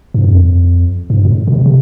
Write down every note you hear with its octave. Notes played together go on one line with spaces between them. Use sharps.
G2
F2
G2
A2
A#2
C3
C3